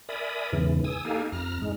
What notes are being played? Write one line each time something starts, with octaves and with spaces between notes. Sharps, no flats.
A#4 D5 E5 G#5 B5 D#6
E2 G#2 C#3 E3
G#5 D#6 E6
A#3 D#4 G4 A4 F5 G#5
F2 A#5 F6
G#2 G#3